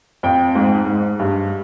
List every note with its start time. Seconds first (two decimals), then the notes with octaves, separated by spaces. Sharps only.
0.23 F2 G5
0.55 G#2
0.87 G#2
1.20 G2